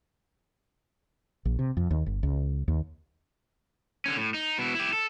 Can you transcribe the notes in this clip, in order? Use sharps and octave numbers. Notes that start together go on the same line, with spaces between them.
A#1
C3
F2
D#2
G1
C#2
D#2
D3 C#4
A2
D#4
B2 E4
E4 G4
A4